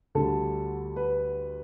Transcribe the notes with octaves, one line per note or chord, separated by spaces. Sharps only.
D2 D3 G3 A4
B4